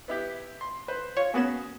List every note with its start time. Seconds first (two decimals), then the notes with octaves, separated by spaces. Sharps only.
0.08 B3 E4 G4
0.61 C6
0.88 B4 C5
1.17 F4 C#5
1.34 A#3 B3 C#4 F#4 G#4 E7